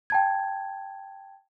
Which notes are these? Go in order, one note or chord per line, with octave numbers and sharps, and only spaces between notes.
G5 A5 G#6